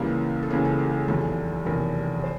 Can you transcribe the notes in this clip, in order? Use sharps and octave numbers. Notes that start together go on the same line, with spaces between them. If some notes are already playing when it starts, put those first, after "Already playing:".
Already playing: C#2 C#3 E3 G3 A#3
A4
C#2 C#3 E3 G3 A#3 G#4
A4
G4
G#4
F1 E2 C3 D#3 F#3 A4
F1 E2 C3 D#3 F#3 A#4
C5